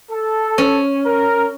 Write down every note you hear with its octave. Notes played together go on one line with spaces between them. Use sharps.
A4
C#4
A#4